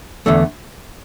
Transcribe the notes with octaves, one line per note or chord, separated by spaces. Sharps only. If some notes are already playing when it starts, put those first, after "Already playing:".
E2 D3 A3